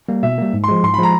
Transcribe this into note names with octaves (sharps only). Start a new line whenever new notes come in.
G3 A#3
B2 E5
G3 A#3
G#2
C6
F3 G#3
G#2 C6
B5
F3 G#3 A#5